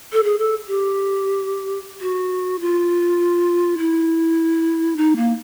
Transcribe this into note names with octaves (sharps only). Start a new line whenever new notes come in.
A4
G#4
A4
G4
F#4
F4
E4
D#4
A#3